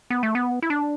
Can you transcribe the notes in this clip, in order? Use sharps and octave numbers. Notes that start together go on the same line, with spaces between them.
B3
A3
B3
E4
D4